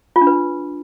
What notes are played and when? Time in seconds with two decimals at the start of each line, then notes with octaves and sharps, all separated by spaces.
0.16 F4
0.21 D4
0.27 B4